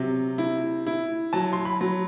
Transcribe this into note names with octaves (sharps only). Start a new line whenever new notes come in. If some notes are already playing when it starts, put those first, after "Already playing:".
Already playing: C3 F#3
E4
E4
F#3 A5
C6
B5
F#3